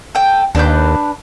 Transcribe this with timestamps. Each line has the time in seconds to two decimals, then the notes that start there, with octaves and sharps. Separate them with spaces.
0.15 A4 G5
0.55 D#2 D4 B4 G6